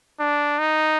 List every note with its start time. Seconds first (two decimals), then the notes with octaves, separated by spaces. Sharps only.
0.19 D4
0.59 D#4